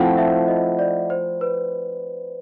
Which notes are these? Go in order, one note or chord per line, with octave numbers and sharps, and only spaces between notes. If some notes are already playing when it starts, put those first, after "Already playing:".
Already playing: F3 A3 C4 E4 F#5
E5
D#5
D5
C5
B4